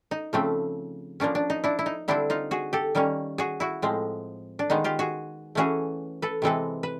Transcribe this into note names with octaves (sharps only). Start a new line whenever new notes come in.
D#4
C#3 F3 A3 C4
F3 A#3 C#4 D4
D4
D#4
D4 E4
E4
D#4
D3 G3 C4 D4 E4
D#4 F4
F#4 G#4
G4 A4
D#3 G3 A#3 C#4
F#4 G#4
E4 F#4
A2 F3 G#3 C4
D4
D#3 G#3 B3 D#4
F4 G4
F#4 G#4
E3 A3 C#4 F#4 G#4
A4 B4
C3 E3 G#3 C4 A4 B4
B4